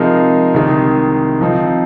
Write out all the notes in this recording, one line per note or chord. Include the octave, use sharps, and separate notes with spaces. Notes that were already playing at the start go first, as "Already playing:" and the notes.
Already playing: C3 F3 G#3 D#4 A#4
C2 C3 D#3 G#3
F3 C4 D#4